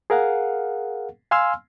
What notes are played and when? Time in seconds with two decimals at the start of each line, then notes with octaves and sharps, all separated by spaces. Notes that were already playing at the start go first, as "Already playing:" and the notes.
0.10 G#4 A#4 F5 F#5
1.31 F5 G#5 C6 E6 F6